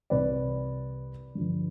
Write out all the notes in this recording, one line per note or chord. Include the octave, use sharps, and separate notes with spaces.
C2 C3 E3 B4 D5
G2 D3 F3